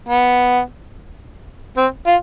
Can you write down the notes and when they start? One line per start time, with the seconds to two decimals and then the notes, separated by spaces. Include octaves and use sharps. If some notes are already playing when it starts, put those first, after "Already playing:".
0.09 B3
1.78 C4
2.07 F4